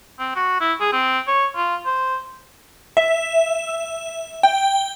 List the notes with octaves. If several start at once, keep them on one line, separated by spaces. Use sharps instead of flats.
C4
F#4
E4
G#4
C4
C#5
F4
C5
E5
G5